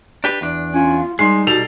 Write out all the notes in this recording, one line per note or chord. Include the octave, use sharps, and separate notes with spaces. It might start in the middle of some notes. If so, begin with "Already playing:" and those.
D4 G4 B4
E2 D4
C#4 F4
G3 G#3 D#4 C6 C7
B2 G3 A4 F7